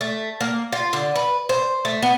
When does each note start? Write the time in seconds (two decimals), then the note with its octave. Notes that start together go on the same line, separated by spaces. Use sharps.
0.01 A3
0.41 A#3
0.72 F4
0.93 D3
1.16 B4
1.49 C5
1.85 A3
2.03 B3